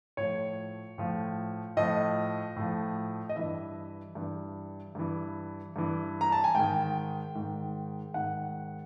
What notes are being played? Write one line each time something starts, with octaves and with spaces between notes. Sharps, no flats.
A2 F3 C#5
A2 F3
A2 F3 D#5
A2 F3
D#5
G2 E3 E5
G2 E3
G2 E3
G2 E3
A#5
A5
G#5
G#2 D#3 G5
G#2 D#3
G#2 D#3 F#5